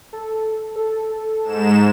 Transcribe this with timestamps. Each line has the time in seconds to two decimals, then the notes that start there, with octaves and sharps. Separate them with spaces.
0.13 A4
0.76 A4
1.44 G#2 E7